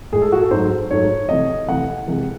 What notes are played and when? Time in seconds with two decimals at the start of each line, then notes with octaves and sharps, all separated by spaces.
0.12 A2 G#3 G#4
0.22 A4
0.32 F#4
0.41 A4
0.51 G#2 F#3 A3 C5
0.91 G#2 F#3 A3 C#5
1.29 C3 E3 A3 D#5
1.68 C3 E3 A3 F#5
2.08 C3 E3 G#3